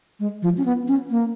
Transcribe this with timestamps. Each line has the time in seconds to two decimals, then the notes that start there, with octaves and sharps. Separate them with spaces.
0.20 G#3
0.42 F3
0.58 C#4
0.65 B3
0.88 C#4
1.11 A#3